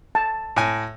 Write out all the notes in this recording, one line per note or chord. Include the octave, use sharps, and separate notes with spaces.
A5
A2 G#5